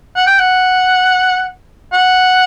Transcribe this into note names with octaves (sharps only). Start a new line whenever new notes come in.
F#5
G5
F#5
F#5